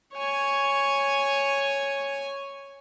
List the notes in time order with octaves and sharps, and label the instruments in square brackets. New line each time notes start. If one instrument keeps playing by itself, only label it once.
[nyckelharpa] C#5 G#5